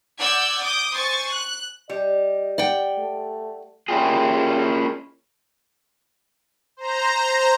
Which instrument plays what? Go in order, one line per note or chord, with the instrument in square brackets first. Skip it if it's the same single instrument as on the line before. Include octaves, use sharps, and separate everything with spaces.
[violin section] D5 F#5 E6 G6 G#6
D6 D#6 G6
C5 G#5 C#6 A6
F#6
[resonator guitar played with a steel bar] G3 [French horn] D#5
[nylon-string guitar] D5 F#5 G5
[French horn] A3
[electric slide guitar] A#3 C#4 E4 F4 G4 G#4
[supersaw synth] C5 A#5